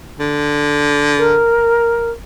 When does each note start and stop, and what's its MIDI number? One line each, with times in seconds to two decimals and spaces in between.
0.20 1.43 50
1.17 2.09 70